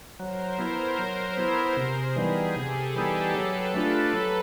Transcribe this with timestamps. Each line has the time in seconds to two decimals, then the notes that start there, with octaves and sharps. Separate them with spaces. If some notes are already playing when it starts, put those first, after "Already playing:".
0.20 F#3 A#4 C5
0.59 B3 E4
0.99 F#3
1.37 B3 E4
1.77 C3 G#4
2.16 E3 G3 B3 D#4
2.55 C3 G4 A4
2.95 E3 G3 B3 D#4
3.34 F#3 A4 B4
3.74 A3 D4 F4
4.14 F#3